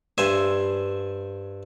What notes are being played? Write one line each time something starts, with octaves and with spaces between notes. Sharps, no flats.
G2 C5 E5 G#5